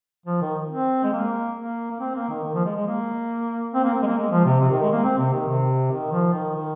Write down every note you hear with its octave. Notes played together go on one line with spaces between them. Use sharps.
F3
D#3
C4
G#3
A#3
A#3
A#3
C4
A#3
D#3
D#3
F3
G#3
G#3
A#3
C4
A#3
C4
G#3
A#3
G#3
F3
C3
C3
D#3
G#3
A#3
C4
C3
D#3
C3
D#3
F3
D#3
D#3